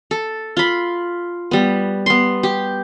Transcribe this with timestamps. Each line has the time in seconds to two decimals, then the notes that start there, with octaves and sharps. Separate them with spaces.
0.11 A4
0.57 F4 B5
1.51 G3 B3
2.06 B3 C6
2.43 G4